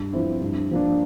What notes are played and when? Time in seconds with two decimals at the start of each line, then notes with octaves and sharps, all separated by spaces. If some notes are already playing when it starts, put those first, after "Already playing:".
Already playing: G2
0.13 F3 C4 E4
0.41 G2
0.71 F3 A#3 D4